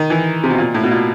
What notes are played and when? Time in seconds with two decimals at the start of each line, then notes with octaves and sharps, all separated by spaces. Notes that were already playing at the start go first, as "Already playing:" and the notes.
Already playing: D#3
0.10 E3
0.43 C3
0.50 B2
0.58 A#2
0.74 A2
0.83 B2
0.91 A#2